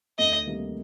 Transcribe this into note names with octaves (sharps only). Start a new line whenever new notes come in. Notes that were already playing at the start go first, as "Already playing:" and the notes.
D2 D#5
C3 D#3 G3 A#3